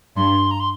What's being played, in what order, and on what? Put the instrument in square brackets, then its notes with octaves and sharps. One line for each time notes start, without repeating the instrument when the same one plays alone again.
[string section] G2 [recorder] C6
[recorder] A#5
C6